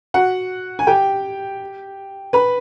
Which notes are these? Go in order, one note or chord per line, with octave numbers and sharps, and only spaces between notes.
F#4 F#5
G#5
G4 G5
B4 B5